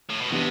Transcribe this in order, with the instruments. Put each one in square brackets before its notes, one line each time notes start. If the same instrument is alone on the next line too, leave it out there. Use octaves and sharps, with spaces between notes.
[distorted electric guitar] A2
B2
[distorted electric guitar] C3 [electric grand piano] E3 B3 D4 G4